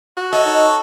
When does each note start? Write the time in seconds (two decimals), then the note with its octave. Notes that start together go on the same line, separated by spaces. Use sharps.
0.17 F#4
0.33 A4 C#5 D#5
0.46 D#4